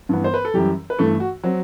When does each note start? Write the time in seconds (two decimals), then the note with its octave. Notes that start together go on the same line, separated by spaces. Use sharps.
0.09 G2 E3 B3
0.24 C5
0.34 B4
0.45 A4
0.54 F#2 E3 G3 G4
0.90 B4
0.99 G2 E3 A3 A4
1.20 F#4
1.43 F#3 C4